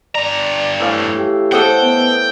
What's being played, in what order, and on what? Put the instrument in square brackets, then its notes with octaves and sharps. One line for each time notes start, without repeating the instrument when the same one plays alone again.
[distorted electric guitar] G2 A#5 [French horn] D5
[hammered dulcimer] A2 E3 F5
[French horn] G4
[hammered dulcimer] C4 [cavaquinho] A4 D#5 F#5 [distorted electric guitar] G5
[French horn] B3